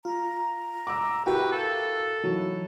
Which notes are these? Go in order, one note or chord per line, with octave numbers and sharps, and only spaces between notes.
F4 A#5
D6 E6
E4 F#4 G4 A#4 B4 G5
A4 F5
E3 F#3 D#4 E4